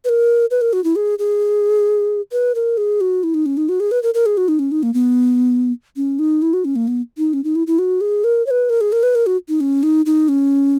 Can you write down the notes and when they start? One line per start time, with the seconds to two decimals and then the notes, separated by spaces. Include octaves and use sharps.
0.05 B4
0.09 A#4
0.51 B4
0.61 A#4
0.73 F#4
0.84 E4
0.96 G#4
1.19 G#4
2.32 B4
2.55 A#4
2.77 G#4
3.01 F#4
3.24 E4
3.34 D#4
3.46 C#4
3.57 D#4
3.69 F#4
3.80 G#4
3.91 B4
4.03 A#4
4.14 A#4
4.26 G#4
4.37 F#4
4.48 D#4
4.59 C#4
4.72 D#4
4.83 A#3
4.94 B3
5.96 C#4
6.19 D#4
6.42 E4
6.53 F#4
6.65 C#4
6.76 A#3
6.88 B3
7.18 D#4
7.33 C#4
7.44 D#4
7.55 E4
7.67 E4
7.79 F#4
8.01 G#4
8.24 A#4
8.46 C#5
8.51 B4
8.70 A#4
8.81 G#4
8.92 A#4
9.03 B4
9.15 A#4
9.26 F#4
9.49 D#4
9.61 C#4
9.83 D#4
10.06 D#4
10.29 C#4